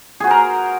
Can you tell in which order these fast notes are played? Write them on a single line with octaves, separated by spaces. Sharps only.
G#4 F#4 C5 A#4